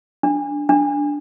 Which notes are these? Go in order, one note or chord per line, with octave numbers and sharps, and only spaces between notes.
D4
D4